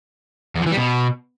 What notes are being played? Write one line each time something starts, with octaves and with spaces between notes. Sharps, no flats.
E2
F3
E3
G3
B2